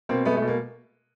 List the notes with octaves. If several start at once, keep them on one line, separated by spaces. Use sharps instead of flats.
B2 A#3 C4
G#3 A3 B3
A3
B2
A#3